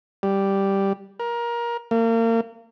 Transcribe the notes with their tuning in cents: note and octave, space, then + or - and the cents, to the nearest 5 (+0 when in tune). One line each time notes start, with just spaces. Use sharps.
G3 +0
A#4 +20
A#3 -35